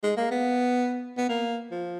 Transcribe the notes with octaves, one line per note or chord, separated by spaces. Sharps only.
G#3
A#3
B3
B3
A#3
F3